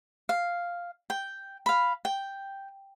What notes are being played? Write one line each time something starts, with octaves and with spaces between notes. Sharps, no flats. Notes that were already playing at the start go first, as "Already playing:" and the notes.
F5
G5
F5 B5
G5